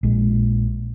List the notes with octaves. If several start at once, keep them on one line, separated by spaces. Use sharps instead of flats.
A#1 G#3